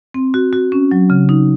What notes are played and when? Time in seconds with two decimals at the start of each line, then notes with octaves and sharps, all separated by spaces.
0.14 C4
0.34 F#4
0.53 F#4
0.72 C#4
0.91 F#3
1.10 C#3
1.29 D#4